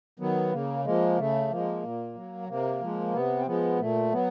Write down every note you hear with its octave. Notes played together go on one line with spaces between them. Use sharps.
D#3 F#3 B3
C#3 A#3
F3 G#3 A#3
C#3 A3
F3 G#3 A#3
A#2
F#3
C3 A#3
F3 G#3
C3 B3
C4
F3 G#3 B3
A#2 A3
F#3 B3